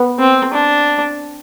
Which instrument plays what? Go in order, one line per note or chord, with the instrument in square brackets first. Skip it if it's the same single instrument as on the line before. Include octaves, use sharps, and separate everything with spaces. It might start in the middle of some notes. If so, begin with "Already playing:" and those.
Already playing: [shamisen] B3
[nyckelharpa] C4
D4